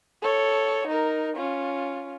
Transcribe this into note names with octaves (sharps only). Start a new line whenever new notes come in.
A4 C#5
D#4 A#4
C#4 F4